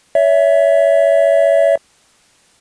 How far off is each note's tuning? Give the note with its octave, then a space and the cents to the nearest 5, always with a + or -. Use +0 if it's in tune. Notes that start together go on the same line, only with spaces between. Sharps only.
C#5 +30 E5 +0